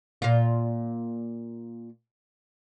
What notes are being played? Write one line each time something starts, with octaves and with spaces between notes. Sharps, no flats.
A#2 F4